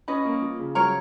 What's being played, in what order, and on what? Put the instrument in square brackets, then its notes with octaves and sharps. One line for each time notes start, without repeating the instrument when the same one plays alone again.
[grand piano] C#4 [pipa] B4 D#5
[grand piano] A#3
F3
C#3
[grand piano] F#3 [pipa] A#4 C#5